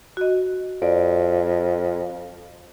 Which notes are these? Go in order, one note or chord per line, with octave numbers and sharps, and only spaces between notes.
F#4 D#5
F2 D5